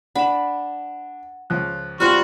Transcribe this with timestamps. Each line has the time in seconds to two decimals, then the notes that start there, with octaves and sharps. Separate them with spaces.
0.15 D4 F#5 B5 E7
1.50 C#2 F3 F#6
2.00 G3 C4 F4 F#4 F6